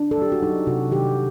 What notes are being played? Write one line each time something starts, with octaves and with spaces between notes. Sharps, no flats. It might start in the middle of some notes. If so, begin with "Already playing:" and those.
Already playing: D4
A4
F#3 G4
F#4
F#3 D#4
C3 F#4
D#3 G4